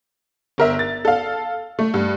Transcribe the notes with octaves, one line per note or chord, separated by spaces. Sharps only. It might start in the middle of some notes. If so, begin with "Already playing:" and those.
G1 A#4 E5
A6
A4 F5
A3
G2